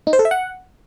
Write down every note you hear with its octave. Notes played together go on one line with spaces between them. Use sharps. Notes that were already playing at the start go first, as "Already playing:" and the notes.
D#4
C5
A4
E5
F#5